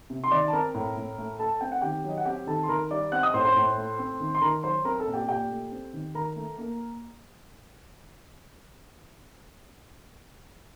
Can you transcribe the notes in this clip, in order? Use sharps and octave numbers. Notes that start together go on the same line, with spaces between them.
C3
C6
D#3 D5 D6
A5
C4 A#4 A#5
A2
A2
A3
A3 A4 A5
C4 G5
F#5
D#3 G4 G5
F#3 D#5
F#5
C4 G4 G5
D#3 A4 A5
C6
D#3 A#4 A#5
G3 D5 D6
C4 F#5 F#6
D#5 D#6
A2 C5 C6
C5 C6
A2
A3
C4
D#3
C6
D#3 A#4 A#5
F#3 C5 C6
C4 A#4 A#5
A4 A5
A#2
G4 G5
A#2 G4 G5
A3
C4
D#3
D#3 A#4 A#5
A3
A#3